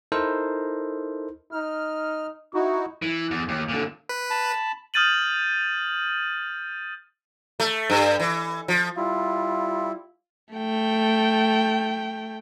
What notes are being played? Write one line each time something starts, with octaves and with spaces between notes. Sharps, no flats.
D#4 E4 A4 A#4 C5
D#4 F6
D#4 E4 F#4 C#6
E3
E2
D#2
A#2 D3
B4
A5 B5
D#6 F6 G6 A6 D#7 F#7
A3
G2
E3
F3
G3 E4 F4
A3 G5